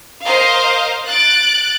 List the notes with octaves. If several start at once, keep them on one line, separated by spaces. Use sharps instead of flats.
A#4 C5 D#5 F5
F#6 A6 D7